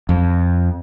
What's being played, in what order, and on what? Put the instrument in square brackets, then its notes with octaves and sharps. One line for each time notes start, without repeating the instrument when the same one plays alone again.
[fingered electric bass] F2